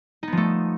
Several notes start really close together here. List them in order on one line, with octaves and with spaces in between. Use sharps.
D#4 B3 F3 A3